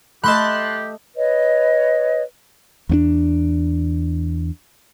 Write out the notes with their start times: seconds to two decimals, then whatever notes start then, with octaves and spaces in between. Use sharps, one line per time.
0.24 A3 G4 A4 D#5 A5 B5 C6 F#6
1.16 B4 C#5 D#5
2.89 E2 B3 D4